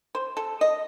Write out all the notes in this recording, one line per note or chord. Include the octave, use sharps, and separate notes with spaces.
C5
A4
D#5